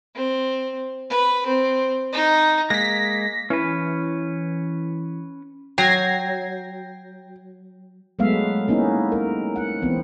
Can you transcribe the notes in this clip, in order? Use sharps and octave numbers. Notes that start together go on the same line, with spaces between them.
C4
B4
C4
D#4
G#3 A#3 A#6 B6
E3 C#4 B4
F#3 G5 G#6 A#6 C7
F#3 G#3 A3 B3 E5 F5
A#3 B3 C#4 D#4 E4
A#4
F#5
E3 B3 C4